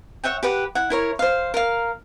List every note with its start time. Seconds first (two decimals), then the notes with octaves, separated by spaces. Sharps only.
0.24 C#5 E5 F#5 G5
0.43 G4 B4 F#5
0.75 E4 F#5
0.90 E4 A#4 C#5
1.19 C5 F5
1.54 A#4 F5